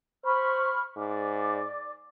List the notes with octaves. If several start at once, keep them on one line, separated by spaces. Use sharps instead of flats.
C5 B5 C#6 F6
G#2 D5 D6